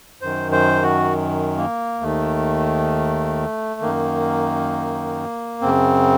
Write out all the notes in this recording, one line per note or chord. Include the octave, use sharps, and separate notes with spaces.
F#2 D#3 C5
C5
F#4
A#3
D#2 D#3 A3
F#2 D#3 A#3
F#2 C#3 C4